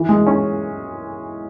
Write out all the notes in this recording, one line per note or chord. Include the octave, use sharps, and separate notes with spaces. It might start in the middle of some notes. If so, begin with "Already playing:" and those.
Already playing: E3
G#3
C#4